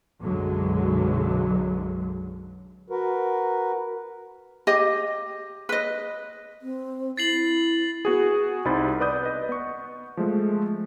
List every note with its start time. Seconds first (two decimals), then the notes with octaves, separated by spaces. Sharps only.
0.20 B1 F#2 B2 D3 F#3 G#3
2.90 F#4 A#4 B4
4.67 G4 D#5
5.69 B4 D#5
6.62 C4
7.17 E4 A6 C7 F#7
8.05 B3 F#4 G#4
8.65 C2 G3 D#4 C5 B5 A6
9.00 B4 D5 D#6 G6
9.23 B4 D#5
9.49 B3 C#6
10.17 F3 G#3 A3